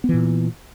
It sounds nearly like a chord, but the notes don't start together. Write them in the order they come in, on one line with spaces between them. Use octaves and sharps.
B3 E3 A#2